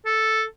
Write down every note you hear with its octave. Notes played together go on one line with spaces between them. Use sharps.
A4